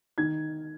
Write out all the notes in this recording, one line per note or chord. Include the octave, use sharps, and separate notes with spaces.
D#3 G#6